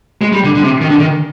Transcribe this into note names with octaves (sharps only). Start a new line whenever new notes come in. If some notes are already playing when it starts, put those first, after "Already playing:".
G#3
G3
D3
D3
C3
D#3
D3
D#3